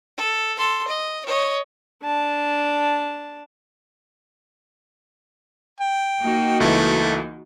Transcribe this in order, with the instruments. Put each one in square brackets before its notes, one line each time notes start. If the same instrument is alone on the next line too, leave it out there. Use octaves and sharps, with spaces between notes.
[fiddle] A4
A4 C6
D#5
C#5 D#5
[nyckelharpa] D4 A5
[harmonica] G5
[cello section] A#3 D#4 F#4
[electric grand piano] C#2 E3 [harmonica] A3